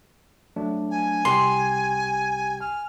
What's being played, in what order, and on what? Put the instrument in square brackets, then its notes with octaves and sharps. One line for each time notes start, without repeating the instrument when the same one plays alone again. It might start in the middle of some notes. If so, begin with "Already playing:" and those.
[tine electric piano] F#3 A3 D4
[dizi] G#5
[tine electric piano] C2 G4 G5 [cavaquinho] C6
[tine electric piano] G#5 [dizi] F6